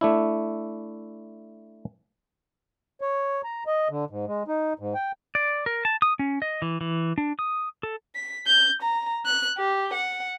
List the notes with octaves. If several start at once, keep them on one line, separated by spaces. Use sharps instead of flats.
A3 D4 E4
C#5
A#5
D#5
D3
G#2
G#3
D#4
G#2
G5
D5
A#4
A5
D#6
C#4
D#5
E3
E3
D4
D#6
A4
B6
G6
A#5
F#6
G4
F#5